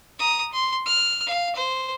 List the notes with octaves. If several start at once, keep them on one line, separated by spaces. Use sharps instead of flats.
A#5 D#6
C6
F6
F5
C5